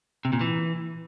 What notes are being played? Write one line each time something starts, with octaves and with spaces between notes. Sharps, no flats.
C3
A#2
E3